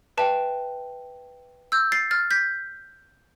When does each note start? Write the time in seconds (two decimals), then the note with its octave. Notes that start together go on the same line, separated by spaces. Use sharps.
0.17 B4 E5 G5 A5
1.72 E6 G6
1.92 A6 C7
2.11 F6 A6
2.31 G6 B6